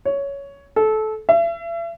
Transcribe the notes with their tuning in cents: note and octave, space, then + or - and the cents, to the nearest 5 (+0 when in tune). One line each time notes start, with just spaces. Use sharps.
C#5 +10
A4 -20
E5 +40